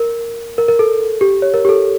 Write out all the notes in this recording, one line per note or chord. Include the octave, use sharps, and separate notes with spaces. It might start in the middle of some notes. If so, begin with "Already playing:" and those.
Already playing: A#4
A#4
A#4
A4
G4
C#5
A#4
G4
A4